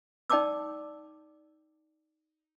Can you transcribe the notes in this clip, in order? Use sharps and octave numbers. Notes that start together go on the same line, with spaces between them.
D#4 D5 G5 A5 D6 E6